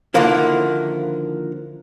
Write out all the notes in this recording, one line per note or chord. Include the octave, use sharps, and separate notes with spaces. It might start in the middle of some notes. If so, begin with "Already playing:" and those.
D3 D#3 F3 A#3 E4